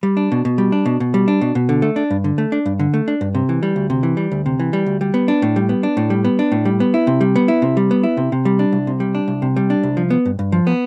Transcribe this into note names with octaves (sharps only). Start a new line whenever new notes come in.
G3
D4
B2
B2
G3
D4
B2
B2
G3
D4
B2
B2
D3
A3
D4
G2
D3
A3
D4
G2
D3
A3
D4
G2
C3
E3
G3
D2
C3
E3
G3
D2
C3
E3
G3
D2
G3
B3
D4
A2
G3
B3
D4
A2
G3
B3
D4
A2
G3
B3
E4
C3
G3
B3
E4
C3
G3
B3
E4
C3
C3
G3
D4
C2
C3
G3
D4
C2
C3
G3
D4
C2
F3
B3
G2
G2
F3
B3